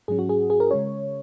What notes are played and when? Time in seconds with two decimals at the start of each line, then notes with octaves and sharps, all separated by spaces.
0.08 G#2 F#3 C#4 G#4
0.19 F#4
0.29 G#4
0.50 G#4
0.60 A#4
0.71 C#3 G#3 C#4 C#5